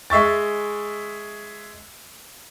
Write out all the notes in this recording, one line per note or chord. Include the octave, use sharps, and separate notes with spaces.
G#3 E5 C#6 A6